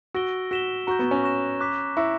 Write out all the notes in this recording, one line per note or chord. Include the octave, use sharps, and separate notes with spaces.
F#4 E6 A#6 D7 G7
F#4 E6 B6 E7 G7
F#4 A#5 C#6 G6
B3
C#4
C#6 F#6 A#6 E7
A#5 D6 F#6 B6
E4 A#5 C#6 E6 A#6 C#7